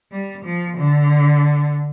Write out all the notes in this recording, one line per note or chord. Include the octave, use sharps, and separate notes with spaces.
G3
F3
D3